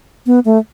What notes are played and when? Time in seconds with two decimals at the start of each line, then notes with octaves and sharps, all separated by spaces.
0.26 B3
0.45 A3